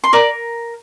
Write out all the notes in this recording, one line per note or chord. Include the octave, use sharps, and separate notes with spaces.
C6
A#4 D5 D6